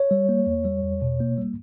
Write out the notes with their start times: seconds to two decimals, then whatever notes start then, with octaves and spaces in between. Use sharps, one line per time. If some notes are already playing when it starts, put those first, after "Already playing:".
Already playing: C#5
0.11 G3
0.29 A#3
0.47 E2
0.65 G3
0.84 E2
1.02 B2
1.20 A#3
1.38 G3